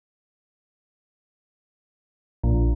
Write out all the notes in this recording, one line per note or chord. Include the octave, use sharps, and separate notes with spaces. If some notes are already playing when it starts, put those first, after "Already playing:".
A#1